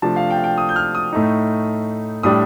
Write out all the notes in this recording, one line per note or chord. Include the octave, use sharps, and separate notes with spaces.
C3 F3 A3 D4 A5
F5
G5
F5
G5
D#6
G6
F6
D#6
A2 A3 D#4
A2 G3 D4 D#6